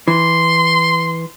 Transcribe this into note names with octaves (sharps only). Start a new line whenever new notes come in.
E3 C6